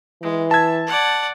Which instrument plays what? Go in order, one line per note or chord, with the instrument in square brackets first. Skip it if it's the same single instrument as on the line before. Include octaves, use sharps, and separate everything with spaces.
[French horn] E3 [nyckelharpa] G#3
[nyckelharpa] E5 [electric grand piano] A5 G#6
[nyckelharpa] D5 F#5